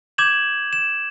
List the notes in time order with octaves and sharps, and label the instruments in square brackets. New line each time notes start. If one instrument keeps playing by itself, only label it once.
[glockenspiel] D6 G6 G#6 E7 F#7
E7